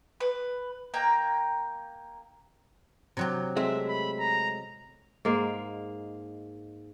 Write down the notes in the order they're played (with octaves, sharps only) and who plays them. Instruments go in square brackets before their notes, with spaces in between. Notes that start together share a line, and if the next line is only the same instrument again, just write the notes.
[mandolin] B4
A#3 G5 A#5
[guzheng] C3 F#3 G4
[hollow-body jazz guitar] G#3 A3 C4 [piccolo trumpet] E5
[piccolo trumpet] B5
A#5
[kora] G#2 G#3 A#3